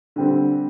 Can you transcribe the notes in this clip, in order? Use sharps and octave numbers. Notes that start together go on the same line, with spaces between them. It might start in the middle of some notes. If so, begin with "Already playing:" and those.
D3 G3 C4